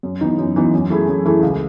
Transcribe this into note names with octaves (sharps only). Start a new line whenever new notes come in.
F#2
E3 B3 D#4
F#2
E3 B3 D#4
F#2
E3 A3 E4 G#4
F#2
E3 A3 E4 G#4
C#2